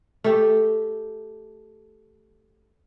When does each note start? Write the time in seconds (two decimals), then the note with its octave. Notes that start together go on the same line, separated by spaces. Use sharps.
0.24 A3 G4